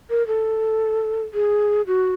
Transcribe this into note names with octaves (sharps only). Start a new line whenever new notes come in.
A#4
A4
G#4
F#4